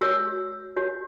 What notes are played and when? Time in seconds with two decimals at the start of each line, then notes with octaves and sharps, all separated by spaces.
0.01 F#4 C#5 E6
0.76 F#4 C#5